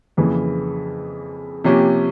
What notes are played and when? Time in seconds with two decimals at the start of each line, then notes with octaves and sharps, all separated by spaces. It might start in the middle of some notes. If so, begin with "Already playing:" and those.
0.17 F2 C#3 E3 A#3
1.64 C3 F3 A#3 C#4 G4